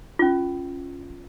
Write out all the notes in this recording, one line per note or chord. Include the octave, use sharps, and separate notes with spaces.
C#4 F4